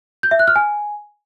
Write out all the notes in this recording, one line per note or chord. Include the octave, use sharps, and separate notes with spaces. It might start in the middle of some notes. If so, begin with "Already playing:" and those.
G6
E5
F#6
F6
G#5